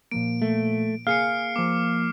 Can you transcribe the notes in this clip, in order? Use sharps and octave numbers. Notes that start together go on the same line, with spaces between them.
A#2 F3 A#3 D7
A3
A#3 G#4 F5 G#5 F6 C7 C#7
F3 A#3 D6